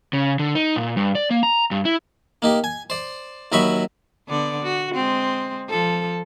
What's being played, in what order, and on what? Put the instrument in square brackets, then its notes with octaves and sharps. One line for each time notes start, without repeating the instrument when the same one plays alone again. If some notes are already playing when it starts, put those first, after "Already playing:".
[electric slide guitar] C#3
D3
D#4
A#2
G2
D5
A#3
A#5
G2
E4
[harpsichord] A#3 D#4 G4
G#5
C5 D5
D#2 F#3 D#5 E5 B5 C#6
[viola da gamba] D3 B3 D5
F#4
G#3 C4
F3 A4